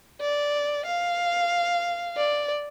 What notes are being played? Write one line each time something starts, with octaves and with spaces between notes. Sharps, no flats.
D5
F5
D5